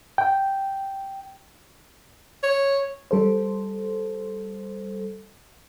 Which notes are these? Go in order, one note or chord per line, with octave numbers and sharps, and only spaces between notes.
G5
C#5
G3 A4 C5